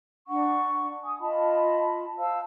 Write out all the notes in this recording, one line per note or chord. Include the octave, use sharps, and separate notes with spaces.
D4 F#5 C#6
G#5 D#6
F4 D#5 A5 B5
C5 F5 A5 E6